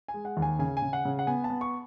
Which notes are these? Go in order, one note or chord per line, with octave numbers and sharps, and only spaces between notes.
G#5
G#3
F#5
D#2
G#5
C#3 G#5
G#5
C#3
F#5
C#3
F#5
B3 G#5
A5
B3
C#6